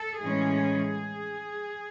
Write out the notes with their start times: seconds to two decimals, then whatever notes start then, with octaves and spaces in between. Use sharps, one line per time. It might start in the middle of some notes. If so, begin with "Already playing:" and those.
Already playing: A4
0.21 A2 E3 G#3 C#4 G#4